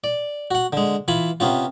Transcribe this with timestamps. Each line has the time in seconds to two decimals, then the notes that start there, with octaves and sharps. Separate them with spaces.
0.04 D5
0.51 F#4 F#5
0.73 D3 G#3
1.08 E3 F4 G#5 B5
1.40 C3 B3 C#4 F4